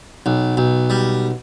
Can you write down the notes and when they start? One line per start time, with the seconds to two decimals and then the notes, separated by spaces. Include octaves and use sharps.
0.26 B1
0.57 B1
0.90 G3